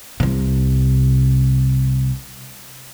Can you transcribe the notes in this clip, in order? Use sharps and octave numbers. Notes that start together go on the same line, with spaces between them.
C2 C3